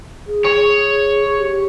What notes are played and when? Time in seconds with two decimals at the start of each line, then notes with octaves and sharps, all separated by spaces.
0.27 G#4
0.45 C#5
1.39 G4